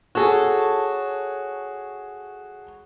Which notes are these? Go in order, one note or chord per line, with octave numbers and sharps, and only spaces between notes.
F#4 G#4 A4 C#5